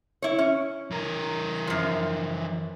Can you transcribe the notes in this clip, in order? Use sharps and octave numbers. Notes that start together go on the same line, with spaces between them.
E4 C#5
C#4
E3 A#4
F#2 F3